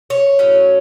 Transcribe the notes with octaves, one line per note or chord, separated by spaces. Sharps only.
C#5
A2 F#3 C#4